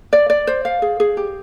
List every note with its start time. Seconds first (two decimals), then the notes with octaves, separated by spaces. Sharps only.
0.13 D5
0.30 D5
0.47 C5
0.65 F5
0.82 G#4
1.00 G#4
1.17 G4